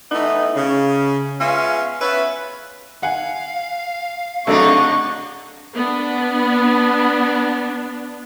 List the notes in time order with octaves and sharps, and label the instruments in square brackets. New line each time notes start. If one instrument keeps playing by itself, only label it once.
[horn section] E3 A3 B3 D#4 E4
C#3
G#3 B3 C#4 F4 E5 F5
B3 C#4 B4 C#5 E5
[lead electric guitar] F5 [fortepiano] F#5 G#5
[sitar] C3 D4 D#4 [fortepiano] F#3 A3 A4 [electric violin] F#5 C#6
[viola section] B3 D4